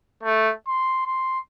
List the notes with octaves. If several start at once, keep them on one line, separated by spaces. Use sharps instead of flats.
A3
C6
C6